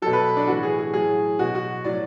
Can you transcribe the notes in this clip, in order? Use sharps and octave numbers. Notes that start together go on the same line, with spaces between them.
B2 F#3 A4
B4
D4
A2 E3 F#4
G#4
G#4
A2 F#3 G#4
B2 F#3 F#4
F#4
A2 F#3 D5